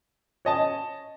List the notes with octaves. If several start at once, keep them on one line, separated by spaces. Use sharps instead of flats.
C#5 D#5 A5